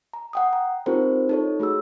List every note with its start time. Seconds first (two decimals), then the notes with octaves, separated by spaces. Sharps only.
0.13 A#5
0.33 F#5 G5 D#6
0.53 A#5
0.86 C4 D#4 F4 G4 A#4 C5
1.29 D#4 A4 C#5
1.60 A3 F#4 G#4 E6